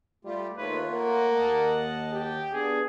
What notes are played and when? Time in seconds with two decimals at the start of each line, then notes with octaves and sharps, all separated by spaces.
0.25 G3 A3 F4 G4
0.57 D#2 A3 F4 B4 C#5
0.91 A#3 F#5
1.35 D#2 D#5 A5
2.12 G4
2.53 B3 D4 G#4